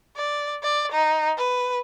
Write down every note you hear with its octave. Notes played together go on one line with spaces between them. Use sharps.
D5
D5
D#4
B4